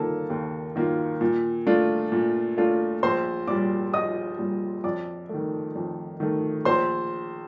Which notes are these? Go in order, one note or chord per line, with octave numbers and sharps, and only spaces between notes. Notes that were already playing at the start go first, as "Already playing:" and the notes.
Already playing: D#3 A#3 F4 A4 A5
D#2
D#3 A#3 F4
A#2
A3 D4 F4
A#2
A3 D4 F4
A#1 C5 C6
A#2 G3 D5 D6
A#1 D#5 D#6
A#2 G3
F2 D5 D6
D#3 A3
F2
D#3 A3
A#1 C5 C6